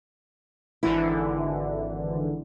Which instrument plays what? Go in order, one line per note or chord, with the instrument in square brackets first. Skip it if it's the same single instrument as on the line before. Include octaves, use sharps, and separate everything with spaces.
[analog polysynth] G#1 D3 E3 [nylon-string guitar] E4